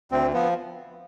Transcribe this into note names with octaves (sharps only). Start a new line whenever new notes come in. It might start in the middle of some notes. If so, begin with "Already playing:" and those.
D2 C4
F3 B3